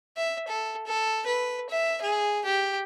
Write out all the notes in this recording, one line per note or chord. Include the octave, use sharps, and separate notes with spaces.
E5
A4
A4
B4
E5
G#4
G4